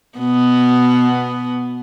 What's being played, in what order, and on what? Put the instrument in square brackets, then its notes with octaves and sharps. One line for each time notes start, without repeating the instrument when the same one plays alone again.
[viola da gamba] B2 B3